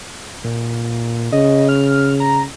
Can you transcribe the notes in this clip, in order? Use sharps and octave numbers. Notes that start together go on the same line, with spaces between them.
A#2
C#3 D#5
F6
A#5